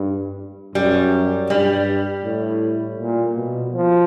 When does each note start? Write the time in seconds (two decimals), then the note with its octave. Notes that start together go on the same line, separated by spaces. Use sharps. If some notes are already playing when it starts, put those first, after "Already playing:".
Already playing: G2
0.75 F#2 G3
1.50 G2 G3
2.25 A2
2.99 A#2
3.36 B2
3.73 F3